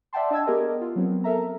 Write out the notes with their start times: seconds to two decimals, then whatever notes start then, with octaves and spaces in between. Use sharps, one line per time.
0.13 D5 E5 F#5 G5 A5 C6
0.31 D4 D#5 E5 A5 E6 G#6
0.47 B3 G4 G#4 A#4 D#5
0.81 F4
0.96 F#3 B3 C4
1.24 A4 A#4 E5 A#5